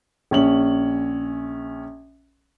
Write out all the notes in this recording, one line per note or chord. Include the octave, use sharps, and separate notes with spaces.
A#1 C#4 F#7